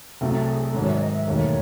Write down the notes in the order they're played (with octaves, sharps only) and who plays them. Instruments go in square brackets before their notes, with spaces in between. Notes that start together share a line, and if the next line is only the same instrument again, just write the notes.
[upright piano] C2 C3 F#3 A3 [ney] E4
[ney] F#4
G#4
A4
[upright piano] G#2 D#3 F#3 [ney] C#5
[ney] E5
C#5
D#5
E5
[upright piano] E1 D#2 D#3 F#3 A3 [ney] C#5